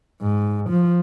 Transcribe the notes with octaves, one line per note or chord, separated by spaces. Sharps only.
G#2
F3